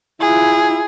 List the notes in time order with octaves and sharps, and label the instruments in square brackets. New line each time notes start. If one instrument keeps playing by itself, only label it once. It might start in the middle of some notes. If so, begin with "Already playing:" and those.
[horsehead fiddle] E4 F4 [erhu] G#4